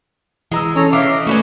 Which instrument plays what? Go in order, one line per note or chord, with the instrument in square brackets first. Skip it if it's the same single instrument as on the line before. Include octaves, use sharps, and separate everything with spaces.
[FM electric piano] E3 A#5 E6 [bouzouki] G#3
[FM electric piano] C#4 [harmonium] A4 C#5 A#5
[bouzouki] E3 [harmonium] F5 [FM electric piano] D6
[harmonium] D#5
[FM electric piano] A3 [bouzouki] C#4 E4 F#4 [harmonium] B4